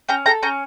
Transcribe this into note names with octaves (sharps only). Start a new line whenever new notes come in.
C#4 G5 A#5
A4 G5 A#5
C#4 G5 A#5